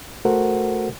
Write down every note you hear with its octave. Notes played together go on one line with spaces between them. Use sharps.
A3 F#4 A4 A#4 C5 F#5